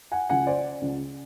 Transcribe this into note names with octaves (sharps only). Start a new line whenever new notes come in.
F#5 G#5
C#2 C#3 F3 F#5 G#5
C5 D5
C#2 C#3 F3